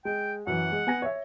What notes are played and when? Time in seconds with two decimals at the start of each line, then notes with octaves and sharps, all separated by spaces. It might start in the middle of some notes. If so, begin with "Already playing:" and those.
0.05 G#3 G5
0.47 F#2 E3 F#5
0.72 G#3
0.87 B3 G#5 A#6
1.02 C#5 E5